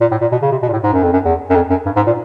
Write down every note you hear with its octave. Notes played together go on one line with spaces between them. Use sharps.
A#2
A2
A#2
B2
C#3
C3
B2
A#2
A2
G#2
F#2
F2
F#2
E2
F#2
F2
F#2
G2
G#2
A#2